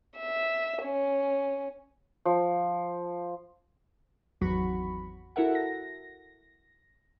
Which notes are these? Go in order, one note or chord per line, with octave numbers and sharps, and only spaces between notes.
E5
C#4
F3
G#1 E2 F#3 F#4 B5 C#6
E4 F#4 A4 A#4 E5 F#5
A#6